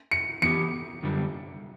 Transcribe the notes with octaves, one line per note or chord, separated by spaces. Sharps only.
C#7
E3 B3 E4 G4 C#7
F#2 D3 G3